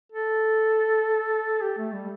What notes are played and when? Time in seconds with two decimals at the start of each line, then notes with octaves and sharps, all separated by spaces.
0.12 A4
1.62 G4
1.78 A3
1.94 G3